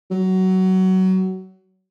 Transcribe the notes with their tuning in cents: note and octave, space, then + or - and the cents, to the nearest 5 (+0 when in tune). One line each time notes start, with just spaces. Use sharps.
F#3 +20